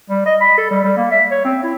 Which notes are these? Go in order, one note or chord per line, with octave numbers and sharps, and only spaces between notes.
G3
D#5
B5
A4
G3
G3
A#3
E5
C#5
C4
E4